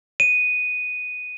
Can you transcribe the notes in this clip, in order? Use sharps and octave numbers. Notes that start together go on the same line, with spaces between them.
D#7